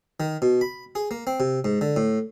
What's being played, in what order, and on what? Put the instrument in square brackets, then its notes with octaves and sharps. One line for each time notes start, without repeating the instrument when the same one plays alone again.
[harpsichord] D#3
B2
B5
G#4
A#3
C4
C3
G#2
D3
A2